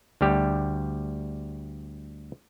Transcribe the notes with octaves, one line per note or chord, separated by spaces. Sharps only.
D2 G3 G4